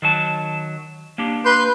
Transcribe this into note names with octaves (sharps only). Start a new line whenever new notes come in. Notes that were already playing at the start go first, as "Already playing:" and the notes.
D#3 F#3 A5
A#3 D4 G4
B4 C6 G6